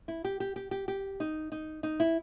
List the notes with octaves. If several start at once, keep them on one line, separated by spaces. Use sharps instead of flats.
E4
G4
G4
G4
G4
G4
D#4
D#4
D#4
E4